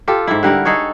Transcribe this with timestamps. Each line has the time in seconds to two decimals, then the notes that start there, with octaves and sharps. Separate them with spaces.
0.08 F4 G4 A4
0.27 G#2 E4
0.43 D3 G3 A#4 F#5
0.65 D#4 G#4 A4 C#5